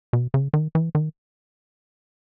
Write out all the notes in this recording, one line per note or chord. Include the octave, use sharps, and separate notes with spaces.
B2
C#3
D#3
E3
D#3